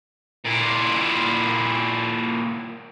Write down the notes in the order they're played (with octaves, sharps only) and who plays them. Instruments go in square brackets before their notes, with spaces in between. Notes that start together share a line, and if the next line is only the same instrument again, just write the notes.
[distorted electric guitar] A#2 E4